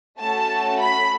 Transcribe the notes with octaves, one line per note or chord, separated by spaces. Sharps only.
A3 C#4 F#4 A4 A5
B5